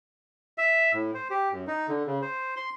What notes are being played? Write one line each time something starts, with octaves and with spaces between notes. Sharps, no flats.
E5
A2
C5
G4
F#2
D#4
D3
C#3
C5
C6